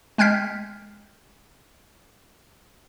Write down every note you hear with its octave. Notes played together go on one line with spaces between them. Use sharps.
G#3 G5 F6 G6 B6